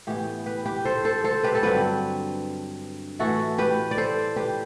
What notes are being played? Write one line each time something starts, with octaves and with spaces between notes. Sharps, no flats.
A2 E3 B3 G4
G4 B4
G4 B4
A4 C5
A4 C5
A4 C5
G4 B4
A4
G2 D3 F#3 C4 G4 B4
A2 E3 A3 F#4 A4
G4 B4
D5
A4 C5
G4 B4